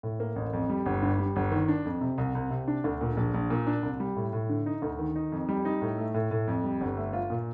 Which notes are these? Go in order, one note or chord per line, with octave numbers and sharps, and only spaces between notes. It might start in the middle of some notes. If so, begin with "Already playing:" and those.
A2
A#3
A1
F2
G3
G1
G2
G3
G1
D#3
D4
F2
C3
C2
C2
C3
D4
D2
A#2
A#1
A#1
A#2
D4
C2
G3
A2
A2
D3
D#4
D2
D#3
D#4
F2
G3
D#4
A2
A3
A2
A2
F2
G3
G1
A3
F4
A#2